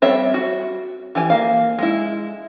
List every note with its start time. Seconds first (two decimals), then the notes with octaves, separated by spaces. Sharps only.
0.02 G3 C4 C#5 E5
0.34 F#4
1.15 E3 G4 G#5
1.30 A#3 F5
1.79 G#3 E4